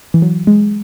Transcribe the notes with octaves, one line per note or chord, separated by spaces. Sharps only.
E3
F#3
G#3